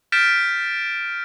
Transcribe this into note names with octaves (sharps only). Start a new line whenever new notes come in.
F6 G6 A6 B6 D7 E7